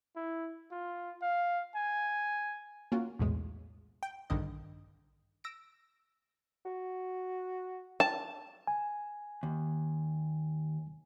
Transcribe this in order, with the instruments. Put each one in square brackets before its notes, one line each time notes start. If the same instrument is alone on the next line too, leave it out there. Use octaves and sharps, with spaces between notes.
[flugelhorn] E4
F4
F5
G#5
[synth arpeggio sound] A#3 C#4 F4 F#4
B1 E2 A2 G#3
G5
A#1 G2 D3 D#3 D#5
E6 A#6 D7
[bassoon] F#4
[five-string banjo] A5
[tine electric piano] G#5
[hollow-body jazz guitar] D#2